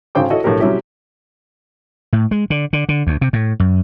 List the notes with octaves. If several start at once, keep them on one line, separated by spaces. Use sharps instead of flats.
G#1 C#3 C5 G5 A5 D6
E4 F#4 A4 C#5 D#5
B1 A2 D3 G4 A#4
C3 F#3 G3 C#4 E4 G4
A2
G#3
D3
D3
D3
D2
C3
A2
F#2